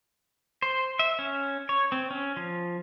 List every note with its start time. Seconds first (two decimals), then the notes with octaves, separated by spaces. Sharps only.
0.62 C5
0.99 E5
1.19 C#4
1.69 C#5
1.92 C4
2.11 C#4
2.37 F3